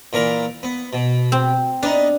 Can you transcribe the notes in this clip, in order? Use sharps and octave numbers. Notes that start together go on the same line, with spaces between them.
A#2 E3 A#4
B3
B2
C4
B3 D4 D#4